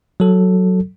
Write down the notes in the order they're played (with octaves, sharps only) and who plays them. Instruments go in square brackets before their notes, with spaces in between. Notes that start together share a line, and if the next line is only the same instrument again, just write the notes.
[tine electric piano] F#3 A4